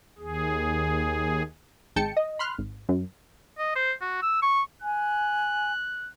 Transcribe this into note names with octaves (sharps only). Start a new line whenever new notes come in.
D#2 G#4
G#1 G#3 G5 A5 C#7
D#5
B5 C6 F6 F#6
G#1
F#2
D#5
C5
F#4
E6
C#6
G#5 F#6